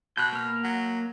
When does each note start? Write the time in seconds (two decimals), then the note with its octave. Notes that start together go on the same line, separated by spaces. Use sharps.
0.17 B2 F#6 G6
0.33 A#3 F6
0.64 F#3